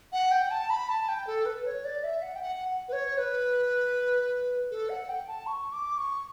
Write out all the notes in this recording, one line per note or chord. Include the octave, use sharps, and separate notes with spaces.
F#5
G5
A5
B5
A5
G5
A4
B4
C#5
D5
E5
F#5
G5
F#5
B4
C#5
B4
A4
F#5
G5
A5
C#6
D6
C#6